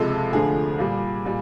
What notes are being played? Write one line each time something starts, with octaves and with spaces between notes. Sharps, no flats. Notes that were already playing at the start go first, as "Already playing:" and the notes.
Already playing: C#2 C3 F3 G#3 A4
D2 D3 F3 A3 G#4
A#2 G3
A#2 G3